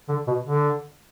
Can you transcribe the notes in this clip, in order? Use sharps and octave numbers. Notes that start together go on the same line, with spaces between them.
D3
B2
D3